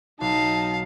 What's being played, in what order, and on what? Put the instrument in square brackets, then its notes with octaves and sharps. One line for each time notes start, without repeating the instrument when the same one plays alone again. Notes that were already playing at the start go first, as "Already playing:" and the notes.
[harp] B1 [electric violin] D#4 [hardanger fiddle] F5 [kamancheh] A5